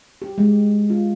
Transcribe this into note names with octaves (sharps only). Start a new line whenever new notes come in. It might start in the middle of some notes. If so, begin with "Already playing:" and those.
G4
G#3
F4